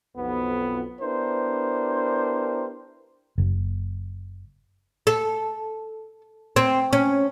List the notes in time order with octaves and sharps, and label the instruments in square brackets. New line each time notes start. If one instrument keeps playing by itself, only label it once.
[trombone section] B1 F2 B3
B3 D4 E4 G4 A#4 C5
[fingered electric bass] F#1
[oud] A4
C4
C#4